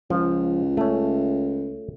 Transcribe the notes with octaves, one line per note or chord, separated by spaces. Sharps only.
C#2 F3
A3 C#4